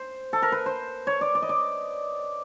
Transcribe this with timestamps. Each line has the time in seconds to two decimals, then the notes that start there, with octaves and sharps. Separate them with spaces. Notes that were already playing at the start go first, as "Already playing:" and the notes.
Already playing: C5
0.33 A4
0.42 A#4
0.52 B4
0.66 C5
1.07 C#5
1.21 D5
1.35 D5
1.42 D#5
1.49 D5